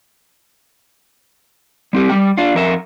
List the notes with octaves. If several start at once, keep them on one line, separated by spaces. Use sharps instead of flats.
G3 C4 G4
G3 G5
D4 F4
F2 A#4 E5